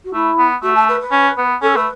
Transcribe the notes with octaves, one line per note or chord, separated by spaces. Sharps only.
F#4
A3 E4
B3
A3 F#4
A5
B4
B4
C#4
B3
C#4 A4
A3 B4